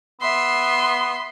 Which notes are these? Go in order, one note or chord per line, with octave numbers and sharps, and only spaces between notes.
B3 E5 C6